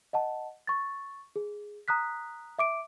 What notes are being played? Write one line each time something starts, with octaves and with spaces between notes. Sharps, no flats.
D#5 F#5 A5
C#6 A6
G#4
A#5 D#6 F#6 B6
E5 D6 D7